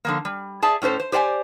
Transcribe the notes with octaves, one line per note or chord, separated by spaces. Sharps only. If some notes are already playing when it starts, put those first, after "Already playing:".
D3 F3 A#3
G3
G#4 D5 E5 A5
A2 C#4 A4 C5
C5
G4 C5 D5 F#5 G#5